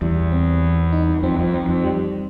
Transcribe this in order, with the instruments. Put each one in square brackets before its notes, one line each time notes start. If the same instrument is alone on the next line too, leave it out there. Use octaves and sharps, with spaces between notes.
[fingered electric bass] E2 [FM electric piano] G3
[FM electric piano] C4
E3
D#4
[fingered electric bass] F2 [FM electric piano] C4
[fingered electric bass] F2
[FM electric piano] C4
[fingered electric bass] F2
[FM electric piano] G3